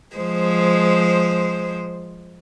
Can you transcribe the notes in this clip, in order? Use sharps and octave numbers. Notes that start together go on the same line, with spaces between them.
F3 G#3 C5